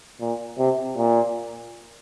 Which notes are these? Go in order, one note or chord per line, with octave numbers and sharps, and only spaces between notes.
A#2
C3
A#2